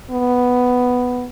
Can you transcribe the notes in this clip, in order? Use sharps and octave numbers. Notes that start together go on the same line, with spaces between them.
B3